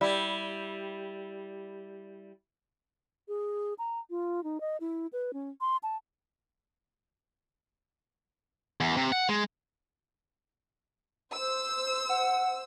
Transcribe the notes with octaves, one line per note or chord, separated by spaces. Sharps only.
G3 E4
G#4
A#5
F4
D#4
D#5
E4
B4
C#4
C6
A5
E2
C3
F#5
G#3
C5 E6
F#5